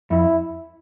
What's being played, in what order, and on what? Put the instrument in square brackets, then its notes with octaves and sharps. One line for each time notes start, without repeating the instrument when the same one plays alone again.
[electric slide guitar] F2 [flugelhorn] E4